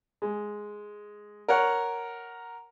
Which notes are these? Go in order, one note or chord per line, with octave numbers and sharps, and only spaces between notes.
G#3
A#4 C#5 F#5